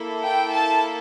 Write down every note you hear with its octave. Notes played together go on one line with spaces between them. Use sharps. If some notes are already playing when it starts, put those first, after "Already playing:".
Already playing: A#3 E4 A4
G5
A5